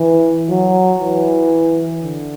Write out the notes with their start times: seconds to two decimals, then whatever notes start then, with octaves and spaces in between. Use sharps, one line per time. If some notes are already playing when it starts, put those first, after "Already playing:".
Already playing: E3
0.50 F#3
1.01 E3
2.03 D3